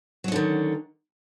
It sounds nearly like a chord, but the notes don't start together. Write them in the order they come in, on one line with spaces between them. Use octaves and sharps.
F#3 C#4 D3 D#3